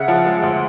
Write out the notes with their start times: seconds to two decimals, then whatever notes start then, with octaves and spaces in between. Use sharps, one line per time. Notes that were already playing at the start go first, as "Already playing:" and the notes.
Already playing: C#3 E5 F#5
0.08 F3
0.26 G#3
0.42 D2